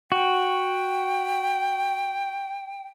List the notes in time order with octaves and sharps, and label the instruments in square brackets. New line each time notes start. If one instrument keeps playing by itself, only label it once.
[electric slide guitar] F#4 [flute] G5